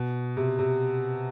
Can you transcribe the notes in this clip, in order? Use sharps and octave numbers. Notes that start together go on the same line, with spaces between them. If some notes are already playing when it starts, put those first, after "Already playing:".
Already playing: B2
C3
C3